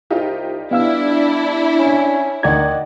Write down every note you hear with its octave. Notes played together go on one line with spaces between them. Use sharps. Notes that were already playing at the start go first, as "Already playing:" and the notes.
C2 D#4 F4 G4
G3 B3 D4 E4 F5 E6
C#4
D2 D#3 D#4 D5 F#5 G#6